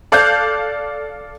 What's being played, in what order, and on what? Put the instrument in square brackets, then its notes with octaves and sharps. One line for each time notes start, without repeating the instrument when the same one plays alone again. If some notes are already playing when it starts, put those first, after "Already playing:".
[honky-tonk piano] A4 D5 F5 F#6 G6